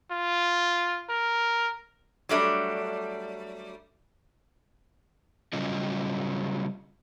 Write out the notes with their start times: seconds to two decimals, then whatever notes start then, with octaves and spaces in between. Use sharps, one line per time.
0.11 F4
1.09 A#4
2.29 F#3 G3 A3 D4
5.53 C#3 F#3 G3 C#4 F4 D#5